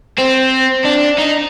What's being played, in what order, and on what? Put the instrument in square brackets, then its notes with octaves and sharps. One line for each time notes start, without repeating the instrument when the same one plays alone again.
[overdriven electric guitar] C4
D4
D#4